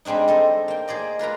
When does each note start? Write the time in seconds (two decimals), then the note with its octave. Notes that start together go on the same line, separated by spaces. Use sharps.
0.05 G3 G#3 C4 D4 D#4
0.28 C4 A4 D#5
0.68 A#3 G5
0.88 G#4 C5 D5 D#5
1.19 F4 A#4 B4 A#5